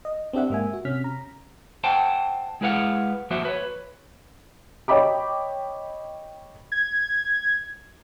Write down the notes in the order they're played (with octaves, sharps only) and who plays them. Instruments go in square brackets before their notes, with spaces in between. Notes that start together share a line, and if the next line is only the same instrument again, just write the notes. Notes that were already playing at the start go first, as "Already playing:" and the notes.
[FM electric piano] D#5
C4 D4 G4 E5 F#5
G#2 A#3 E5 G#5
F#4
C3 C#4 F6 B6
A#5
[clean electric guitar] C5 F#5 G5 A5
G#3 E4 G#4 B4 F5 F#5
F3 A#3 F#4 C5 E5
B4 C#5
[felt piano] C#5 D#5 G5 B5 D6
[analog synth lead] G#6